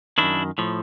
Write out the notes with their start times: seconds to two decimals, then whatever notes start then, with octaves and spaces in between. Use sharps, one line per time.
0.18 F#2 D#3 D4 E4
0.58 A2 F3